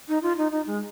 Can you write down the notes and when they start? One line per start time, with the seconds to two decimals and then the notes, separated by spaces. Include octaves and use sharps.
0.08 D#4
0.23 F4
0.38 D#4
0.52 D#4
0.67 G#3